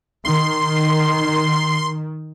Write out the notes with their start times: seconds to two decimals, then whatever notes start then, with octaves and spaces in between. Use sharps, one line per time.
0.25 D#3 C6